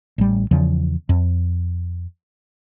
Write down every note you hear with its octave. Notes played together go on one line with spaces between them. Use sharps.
A1 G3
E2 C#3 F3
F2